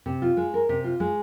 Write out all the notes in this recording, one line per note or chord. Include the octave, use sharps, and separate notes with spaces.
C3
F4
G#3
A#4
C3
F4
G#3